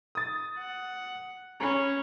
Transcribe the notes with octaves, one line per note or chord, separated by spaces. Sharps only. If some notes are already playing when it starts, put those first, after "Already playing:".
D#6 A6
F#5
C#4 A#5 B5